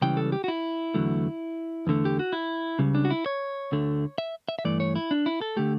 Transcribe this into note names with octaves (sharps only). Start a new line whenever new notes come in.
C#2 C#3 E3 G3 G5
A4
G4
F#4
E4
E2 D3 F#3 A3
E2 D3 A3
G4
F#4
E4
C#2 C#3 G3
D4
F#4
E4
C#5
D2 D3 A3
E5
E5
E5
G2 E3 A3 D5
C#5
E4
D4
E4
A4
D3 A3 G4